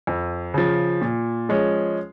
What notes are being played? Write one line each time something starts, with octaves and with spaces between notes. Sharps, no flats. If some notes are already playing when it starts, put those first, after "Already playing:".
F2
C#3 F3
A#2
F3 G#3 C#4